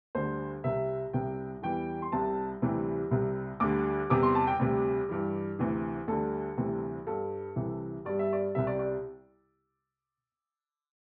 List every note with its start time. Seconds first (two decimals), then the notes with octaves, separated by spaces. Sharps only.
0.15 D2 D3 G3 C5
0.64 C2 C3 G3 E5
1.13 C2 C3 G3 G5
1.62 E2 E3 G3 G5
2.02 C6
2.12 C2 C3 G3 A5
2.62 D2 C3 E3 G3
3.11 C2 C3 G3
3.60 D2 D3 G3 D6
4.10 E2 C3 G3 D6
4.23 C6
4.35 A5
4.47 G5
4.59 D2 C3 G3
5.09 G2 E3 G3
5.59 D2 C3 E3
6.08 D2 D3 G3 A4
6.58 D2 C3 E3 G3
7.07 G2 G3 A4
7.56 C2 C3 E3
8.05 G2 G3 D5
8.19 E5
8.33 D5
8.55 C2 C3 G3 E5
8.67 D5
8.79 D5